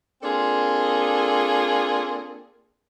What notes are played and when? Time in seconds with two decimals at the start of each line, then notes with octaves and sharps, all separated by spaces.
0.22 A#3 C4 D4 F4 G#4 A4